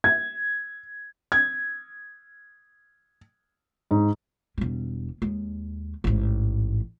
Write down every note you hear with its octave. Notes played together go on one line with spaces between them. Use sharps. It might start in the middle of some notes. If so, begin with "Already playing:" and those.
G#6
G#6
G#2
E1 G3
D#2 G#3
A1 G#2